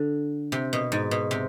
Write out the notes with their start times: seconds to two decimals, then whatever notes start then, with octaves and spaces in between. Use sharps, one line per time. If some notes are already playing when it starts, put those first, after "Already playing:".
Already playing: D3
0.52 C3
0.73 B2
0.92 G#2
1.11 B2
1.31 C3